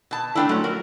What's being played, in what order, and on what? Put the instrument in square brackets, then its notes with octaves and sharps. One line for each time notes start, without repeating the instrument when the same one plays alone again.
[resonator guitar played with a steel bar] B2 A5
[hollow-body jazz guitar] D3 G5 [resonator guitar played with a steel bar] A3 D4 E4
[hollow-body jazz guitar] F#3 A3 C#4 [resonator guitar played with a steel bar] G#3
[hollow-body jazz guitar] F#4 [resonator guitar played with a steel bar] A#4